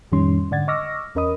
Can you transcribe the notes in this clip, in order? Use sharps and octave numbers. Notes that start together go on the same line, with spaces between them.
F2 A2 D#3 G3 C#4 C6
G#2 D3 D5 F#5 G#6 A6
D#5 C#6 D6 E6 F6 A#6
E2 C#4 A#4 D#5 B5 D#6